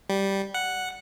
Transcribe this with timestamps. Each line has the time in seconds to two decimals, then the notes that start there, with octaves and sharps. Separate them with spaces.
0.09 G3
0.54 F#5